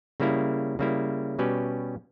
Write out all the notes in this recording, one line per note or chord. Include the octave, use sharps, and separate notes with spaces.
C#3 G3 A#3 E4
C#3 G3 A#3 E4
B2 G3 C#4 G4 B4